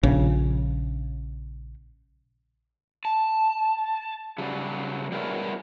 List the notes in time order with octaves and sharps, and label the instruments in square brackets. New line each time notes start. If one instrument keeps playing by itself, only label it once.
[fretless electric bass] A#1 C#3
[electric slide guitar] A5
C#3 F#3 G3
G3 G#3 B3 E4 A#4 C#5